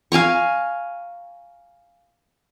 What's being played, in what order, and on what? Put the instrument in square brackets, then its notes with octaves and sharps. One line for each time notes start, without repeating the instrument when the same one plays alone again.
[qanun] F5 G#5 A#5 C#6